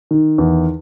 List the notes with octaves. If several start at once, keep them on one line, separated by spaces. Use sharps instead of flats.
D#3
E2